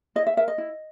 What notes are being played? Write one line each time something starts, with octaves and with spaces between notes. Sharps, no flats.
E4 D#5
E5
A#4 E5
D#5
E4